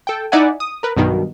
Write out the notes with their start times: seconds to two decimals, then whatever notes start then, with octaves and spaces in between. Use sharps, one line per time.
0.07 A4 G5
0.32 D#4 E4 D5 E5 F#5 G#5
0.60 D#6
0.83 A#4 B4
0.96 B1 G2 B2 D#3